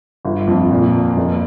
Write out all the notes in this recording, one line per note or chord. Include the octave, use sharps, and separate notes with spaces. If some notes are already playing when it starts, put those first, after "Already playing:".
G1
F2
A#2
A#3
F1